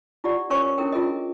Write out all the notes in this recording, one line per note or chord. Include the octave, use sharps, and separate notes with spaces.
E4 F4 G4 D5 F#5
C#4 A#4 C5 C#5 G#5 C#6
C#4 D4 E4 A4 A#4 G5
E4 F4 G#4 A#4 D#5